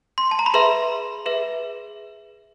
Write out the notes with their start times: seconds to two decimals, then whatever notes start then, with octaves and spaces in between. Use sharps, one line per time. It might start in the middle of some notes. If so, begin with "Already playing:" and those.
0.18 C6
0.31 A5
0.39 A#5
0.46 B5
0.54 G#4 B4 E5 C6
1.26 G#4 B4 E5